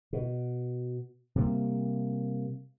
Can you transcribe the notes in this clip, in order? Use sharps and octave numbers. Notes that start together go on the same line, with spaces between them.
B2
C3 G3 A#3